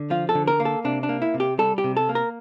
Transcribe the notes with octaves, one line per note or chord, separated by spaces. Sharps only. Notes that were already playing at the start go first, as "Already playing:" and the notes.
Already playing: D3
F3 F4
A4
D3
A#4
A#3
A4
C3 D4
D4
A#3
E4
C3
G4
G3 A4
G4
C3
A4
A#3
A#4